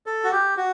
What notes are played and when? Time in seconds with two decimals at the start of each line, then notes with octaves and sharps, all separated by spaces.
0.06 A4
0.24 F#4
0.32 G4
0.57 F#4